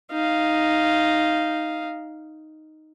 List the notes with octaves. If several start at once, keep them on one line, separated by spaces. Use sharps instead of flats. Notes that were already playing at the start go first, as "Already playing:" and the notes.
D#4 F5